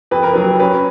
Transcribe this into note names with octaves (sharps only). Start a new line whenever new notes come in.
F2 B4
A#4
F#3 B4
C#4 B4